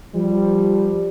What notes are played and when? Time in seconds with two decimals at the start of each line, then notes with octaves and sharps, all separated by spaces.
0.15 F3 G3